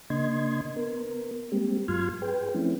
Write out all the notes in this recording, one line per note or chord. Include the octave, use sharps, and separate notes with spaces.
C#3 A#3 D4 D#5 C6 G#6
B3 A#4
G3 G#3 A#3 C4 G4
G2 F#3 F4 C6 F6 G#6
G#4 B4 G5
F3 A3 C4 C#4 E4